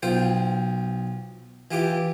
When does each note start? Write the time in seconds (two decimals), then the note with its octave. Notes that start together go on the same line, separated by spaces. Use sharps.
0.03 B1 F4 C5 G5
1.71 E3 F4 G4 D6